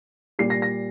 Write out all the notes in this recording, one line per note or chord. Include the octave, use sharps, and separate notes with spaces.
A#2 G3 C7
A#6
A#6